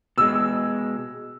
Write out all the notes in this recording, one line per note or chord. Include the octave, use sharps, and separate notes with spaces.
B2 G#3 E6